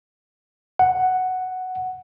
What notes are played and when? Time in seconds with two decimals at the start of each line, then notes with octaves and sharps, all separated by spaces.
0.79 F#5